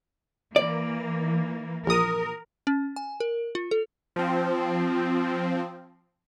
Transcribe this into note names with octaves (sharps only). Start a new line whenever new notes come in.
E3 A#3 D5
A#1 A#4 D#6
C#4
G#5
A#4
F4
A4
F3 C4